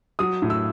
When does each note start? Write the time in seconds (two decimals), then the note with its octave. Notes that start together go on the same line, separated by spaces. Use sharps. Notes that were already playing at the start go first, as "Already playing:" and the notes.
0.19 F#3 D#6
0.42 A2
0.50 E6